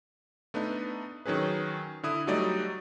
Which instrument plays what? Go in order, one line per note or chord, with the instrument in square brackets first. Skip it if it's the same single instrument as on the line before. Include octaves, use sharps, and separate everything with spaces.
[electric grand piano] A3 B3 D4 D#4
D#3 F#3 C#4 G#4 B4
D3 E4 D#6
F#3 G3 A3 D#4 F#4 D5